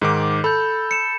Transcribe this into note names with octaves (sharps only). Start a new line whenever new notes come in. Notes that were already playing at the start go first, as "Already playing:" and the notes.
G#2 D#3 D6
A4 B5 G6
C#7 E7